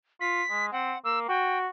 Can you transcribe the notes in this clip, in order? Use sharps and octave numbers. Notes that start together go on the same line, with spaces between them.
F4 B6
G#3
C4 F#5
A#3 E6
F#4 G5